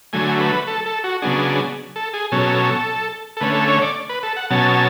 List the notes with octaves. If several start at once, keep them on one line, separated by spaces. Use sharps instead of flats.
D3 F#3 A3 G#5
B4
A4
A4
F#4
C#3 F#3 B3 D4 G#4
A4
G#4
B2 F#3 C#4 A4
A4
D3 A3 C#4 B4
A4
C#5
D5
B4
A4
F#5
B2 F#3 C#4 A5